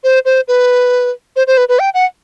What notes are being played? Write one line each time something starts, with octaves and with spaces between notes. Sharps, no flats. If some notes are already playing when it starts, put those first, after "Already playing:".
C5
C5
B4
C5
C5
B4
B4
G5
F#5